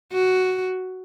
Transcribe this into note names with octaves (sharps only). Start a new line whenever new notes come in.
F#4